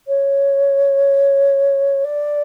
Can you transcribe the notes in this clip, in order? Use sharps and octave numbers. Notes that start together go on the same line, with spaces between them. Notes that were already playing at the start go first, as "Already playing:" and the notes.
C#5
D5